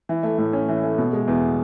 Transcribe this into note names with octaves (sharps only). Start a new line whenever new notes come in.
E3
A3
A2
C#4
E3
A3
B2
G#3
E2